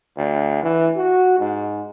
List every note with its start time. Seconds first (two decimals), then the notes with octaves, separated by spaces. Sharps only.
0.18 D2
0.63 E3
0.97 F#4
1.39 G#2